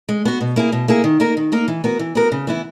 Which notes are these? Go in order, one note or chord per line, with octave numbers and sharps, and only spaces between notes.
G#3
B3 F#4
B2
A#3 E4 G#4
B2
A#3 E4 G#4
D#3
A#3 D#4 A#4
D#3
A#3 D#4 A#4
E3
B3 F#4 A#4
E3
B3 F#4 A#4
C#3
E3 B3 E4